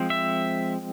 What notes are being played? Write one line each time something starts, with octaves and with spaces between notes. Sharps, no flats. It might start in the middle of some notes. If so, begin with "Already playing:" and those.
Already playing: F3 G#3 C4
E5